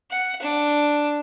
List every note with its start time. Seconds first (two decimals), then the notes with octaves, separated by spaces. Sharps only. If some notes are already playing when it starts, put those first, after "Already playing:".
0.11 F#5
0.42 D4